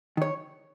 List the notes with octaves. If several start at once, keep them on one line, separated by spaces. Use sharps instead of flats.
D#3 C#5